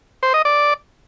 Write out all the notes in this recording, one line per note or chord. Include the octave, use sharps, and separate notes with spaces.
C5
D#5
D5